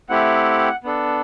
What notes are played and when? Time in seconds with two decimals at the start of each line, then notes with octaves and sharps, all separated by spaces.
0.09 A3 C4 E4 G4 F#5
0.84 B3 D4 A4